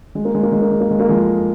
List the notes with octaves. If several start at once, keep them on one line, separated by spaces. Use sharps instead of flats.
G#3
A#3
G#3
A#3
G#3
A#3
G#3
A#3
G#3
A#3
F3 G#3